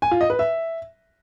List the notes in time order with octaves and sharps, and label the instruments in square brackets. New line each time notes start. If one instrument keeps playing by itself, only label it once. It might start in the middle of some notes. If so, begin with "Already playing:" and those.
[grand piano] G#5
F4
D#5
B4
E5